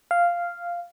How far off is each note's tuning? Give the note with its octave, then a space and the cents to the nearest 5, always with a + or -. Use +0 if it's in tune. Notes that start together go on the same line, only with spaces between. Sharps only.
F5 -5